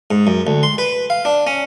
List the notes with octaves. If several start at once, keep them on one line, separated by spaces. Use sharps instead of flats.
G#2
F#2
D2
C6
B4
F5
D4
C#4